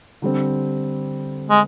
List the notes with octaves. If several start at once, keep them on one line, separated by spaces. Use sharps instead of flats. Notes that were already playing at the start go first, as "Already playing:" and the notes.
D3 G3 C4
G#3